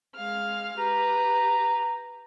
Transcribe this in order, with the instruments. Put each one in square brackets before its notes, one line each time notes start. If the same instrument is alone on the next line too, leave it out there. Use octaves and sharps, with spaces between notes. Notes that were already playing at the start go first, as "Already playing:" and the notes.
[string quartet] G#3 F5 F6
[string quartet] G4 B4 [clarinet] A#5